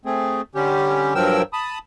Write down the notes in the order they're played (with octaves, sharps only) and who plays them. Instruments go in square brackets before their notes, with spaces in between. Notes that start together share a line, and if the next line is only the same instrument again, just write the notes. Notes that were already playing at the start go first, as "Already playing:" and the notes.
[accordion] A3 C4 G#4
D3 G3 C#4 G4
G2 F3 F#3 A#4 G5 E6
A5 B5 D#6